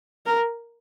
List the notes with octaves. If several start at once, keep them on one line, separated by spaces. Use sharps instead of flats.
A#4